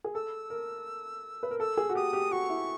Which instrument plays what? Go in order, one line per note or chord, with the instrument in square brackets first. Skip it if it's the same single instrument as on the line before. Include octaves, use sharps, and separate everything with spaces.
[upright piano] G#4
[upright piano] A4 [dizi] E6
[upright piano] A#4
B4
A#4
[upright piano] A4 [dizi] E6
[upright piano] G#4
F#4
[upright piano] G4 [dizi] D#6
[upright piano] G4
[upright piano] F#4 [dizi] C#6
[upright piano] E4